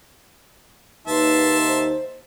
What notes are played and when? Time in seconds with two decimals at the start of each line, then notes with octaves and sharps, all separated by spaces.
1.07 D#2 D#4 B4 E5 A5 C6
1.67 C5